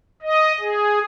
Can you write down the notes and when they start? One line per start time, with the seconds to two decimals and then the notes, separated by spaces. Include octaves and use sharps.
0.22 D#5
0.60 G#4